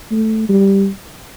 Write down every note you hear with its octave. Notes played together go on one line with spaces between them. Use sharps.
A3
G3